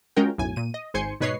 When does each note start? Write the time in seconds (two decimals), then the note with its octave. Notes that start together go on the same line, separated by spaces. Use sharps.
0.16 G#3 C#4 F4 F#4 A#4 G5
0.38 B1 F#2 A2 G#5
0.56 A#2 D#7
0.74 D#5
0.94 G#1 G#2 C5 G#5 C6 C#7
1.20 G#2 B2 B4 C#5 D#5 C7